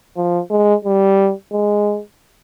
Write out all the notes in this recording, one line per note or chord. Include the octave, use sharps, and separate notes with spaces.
F3
G#3
G3
G#3